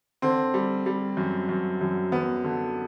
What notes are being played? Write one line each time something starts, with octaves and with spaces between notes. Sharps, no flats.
D3 C4
G3
G3
F#2
F#2
F#2
F#2 B3
D3